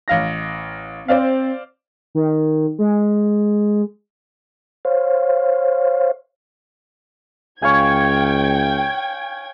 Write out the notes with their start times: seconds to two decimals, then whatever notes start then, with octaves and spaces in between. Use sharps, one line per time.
0.08 A1 F5 A#6
1.08 C4 C5 D5 F5
2.15 D#3
2.79 G#3
4.85 C5 C#5 F5
7.62 C#2 C#5 F5 G5 G#5 G#6